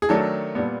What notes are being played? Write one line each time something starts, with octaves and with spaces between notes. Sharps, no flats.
G#4
D#3 F#3 A3 D4 A4
A#2 G3 B3